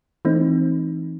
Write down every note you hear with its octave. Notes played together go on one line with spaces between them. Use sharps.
E3 A3 C4 D#4